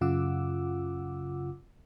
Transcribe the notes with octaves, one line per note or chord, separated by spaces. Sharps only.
F#2 C#3 F4 F#5 D6 E6